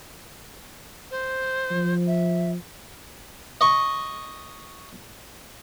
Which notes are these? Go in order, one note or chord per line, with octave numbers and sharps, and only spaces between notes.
C5
F3
E5
D#5 C#6